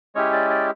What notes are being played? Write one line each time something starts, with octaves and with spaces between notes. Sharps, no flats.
G#3 C#4 E4 G4 C#5
D5
D5